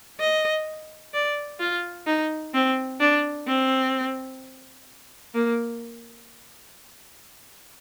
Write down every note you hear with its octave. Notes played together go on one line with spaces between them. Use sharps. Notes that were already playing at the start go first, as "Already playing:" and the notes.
D#5
D5
F4
D#4
C4
D4
C4
A#3